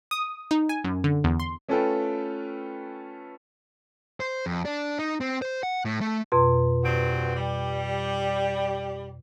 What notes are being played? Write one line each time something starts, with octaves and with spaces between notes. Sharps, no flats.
D#6
D#4
G#5
F#2
D3
E2
C6
A3 C#4 F4 A4 B4 G5
C5
F2
D4
D#4
C4
C5
F#5
A2
A3
F2 B2 C6
G2 C4 F#4
G3